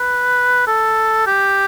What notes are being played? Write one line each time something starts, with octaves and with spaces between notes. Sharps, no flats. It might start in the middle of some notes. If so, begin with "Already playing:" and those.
Already playing: B4
A4
G4